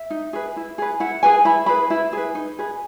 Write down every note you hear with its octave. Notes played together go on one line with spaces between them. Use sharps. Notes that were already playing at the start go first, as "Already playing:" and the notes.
Already playing: E5
D#4
G#4 B4
E4
G#4 B4
E4 F#5
G#4 B4 G#5
E4 B5
G#4 B4 B5
E4
G#4 B4
D#4
G#4 B4